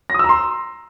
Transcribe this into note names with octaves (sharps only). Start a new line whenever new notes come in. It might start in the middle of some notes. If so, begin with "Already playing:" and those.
A#5 C6 D#6 E6 A#6